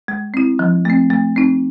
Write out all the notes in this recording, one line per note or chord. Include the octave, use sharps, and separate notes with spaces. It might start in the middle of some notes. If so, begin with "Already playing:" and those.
G#3
C4 E4
F3
A3 C4
A3
C4 D#4